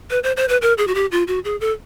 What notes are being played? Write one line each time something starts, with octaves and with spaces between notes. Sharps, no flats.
B4
C5
C5
B4
A#4
G#4
F#4
G4
F4
F#4
G#4
A4